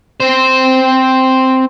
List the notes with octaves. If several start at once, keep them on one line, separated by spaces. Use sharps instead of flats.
C4 C5